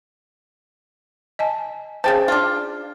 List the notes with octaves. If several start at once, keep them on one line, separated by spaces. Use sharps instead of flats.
D#5 G#5 A5
C#3 G#4 C5 G5 A5
D4 F4